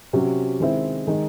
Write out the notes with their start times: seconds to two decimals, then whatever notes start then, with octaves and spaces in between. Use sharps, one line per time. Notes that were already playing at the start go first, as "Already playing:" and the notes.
0.13 C3 F#3 C#4
0.60 D#3 G#3 C4 E4
1.07 D#3 G#3 D#4